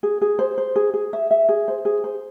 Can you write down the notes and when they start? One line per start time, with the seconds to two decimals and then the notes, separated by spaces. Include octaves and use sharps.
0.03 G#4
0.21 G#4
0.39 C5
0.58 C5
0.76 G#4
0.94 G#4
1.13 E5
1.31 E5
1.49 G#4
1.68 C5
1.85 G#4
2.04 C5